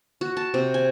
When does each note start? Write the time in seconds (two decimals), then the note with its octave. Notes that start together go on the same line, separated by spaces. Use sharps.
0.21 F#4
0.37 A5
0.54 C3
0.74 G#5